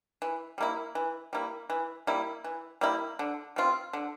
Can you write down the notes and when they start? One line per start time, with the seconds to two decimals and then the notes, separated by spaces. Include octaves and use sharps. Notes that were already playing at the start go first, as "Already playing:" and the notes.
0.22 E3
0.58 G3 A#3 E4
0.95 E3
1.33 G3 A#3 E4
1.70 E3
2.07 G3 A#3 E4
2.44 E3
2.81 G3 A#3 E4
3.19 D3
3.56 G3 C4 F4
3.93 D3